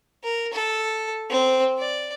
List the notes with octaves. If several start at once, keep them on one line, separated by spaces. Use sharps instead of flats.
A#4
A4
C4
D5